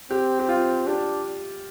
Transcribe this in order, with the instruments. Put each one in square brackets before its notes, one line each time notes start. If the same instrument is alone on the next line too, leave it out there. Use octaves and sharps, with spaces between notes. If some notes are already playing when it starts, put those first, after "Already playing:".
[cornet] C4 [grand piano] G4
[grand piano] G4
F4
[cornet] D4 [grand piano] G4